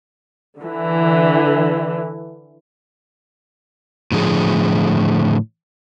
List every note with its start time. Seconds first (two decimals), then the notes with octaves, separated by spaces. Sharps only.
0.60 D3 E3
4.12 A2 D3 F3 G#4